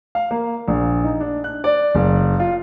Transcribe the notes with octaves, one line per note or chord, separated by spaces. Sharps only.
F5
A#3
A#1
D#4
D4
F#6
D5
F#1
F4